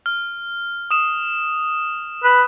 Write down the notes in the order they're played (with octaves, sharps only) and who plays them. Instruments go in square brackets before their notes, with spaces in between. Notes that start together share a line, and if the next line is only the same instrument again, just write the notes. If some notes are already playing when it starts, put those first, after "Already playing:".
[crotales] F6
D#6 E7
[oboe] B4